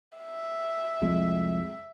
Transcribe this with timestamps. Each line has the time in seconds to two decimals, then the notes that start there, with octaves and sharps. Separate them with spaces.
0.18 E5
1.02 C2 F2 G#3